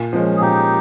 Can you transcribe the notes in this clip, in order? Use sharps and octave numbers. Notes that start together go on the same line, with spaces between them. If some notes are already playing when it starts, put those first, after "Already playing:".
Already playing: A#2
F3 G#3 C#4
G#4
A#2 D#4 G4